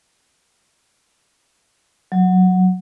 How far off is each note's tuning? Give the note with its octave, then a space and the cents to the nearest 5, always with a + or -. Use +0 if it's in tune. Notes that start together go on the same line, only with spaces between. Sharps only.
F#3 -5